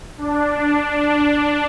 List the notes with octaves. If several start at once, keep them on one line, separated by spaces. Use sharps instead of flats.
D4
D4
D4